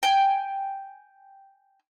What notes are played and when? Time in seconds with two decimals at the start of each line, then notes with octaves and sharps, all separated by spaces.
0.03 G5 G#5